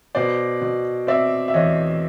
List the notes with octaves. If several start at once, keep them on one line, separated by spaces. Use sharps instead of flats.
B2 C5 D5
B2
C4 D5 E5
E5
E2 C#5 D#5